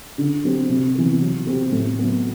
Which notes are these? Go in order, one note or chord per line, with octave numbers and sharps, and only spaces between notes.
D3
F#3 C4 G4
C3
E3 B3
F#3
C4 G4
A2
F#3 B3